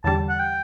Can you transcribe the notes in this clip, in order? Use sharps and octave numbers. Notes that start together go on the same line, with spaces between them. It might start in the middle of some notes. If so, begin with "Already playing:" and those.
E2 D3 G3 A5
F#5
G5